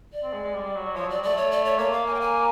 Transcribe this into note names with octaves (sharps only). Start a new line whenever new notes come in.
D5
C4
G#3
G#3
G3
F#3
F3 C#5
F#3 D5
G3
A3 D5
C#5
D5
C#5
A#3 C#5
F5
G#5
G5
G#5